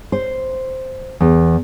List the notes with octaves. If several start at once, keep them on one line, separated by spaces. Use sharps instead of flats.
C5
E2